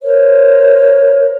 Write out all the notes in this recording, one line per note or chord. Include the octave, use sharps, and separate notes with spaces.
A#4 C5 C#5